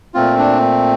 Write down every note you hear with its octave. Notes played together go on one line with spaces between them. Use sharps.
A#2 A3 C4 F4
D4